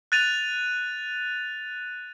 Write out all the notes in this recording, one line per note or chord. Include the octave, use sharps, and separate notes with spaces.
F#6 A6 D#7 F7